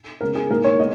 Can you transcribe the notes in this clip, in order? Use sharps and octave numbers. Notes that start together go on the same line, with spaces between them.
C#3 G#3 B3 A#4
G#4
G#2 D#3 A#3 A#4
C#5
G#3 B3 D#5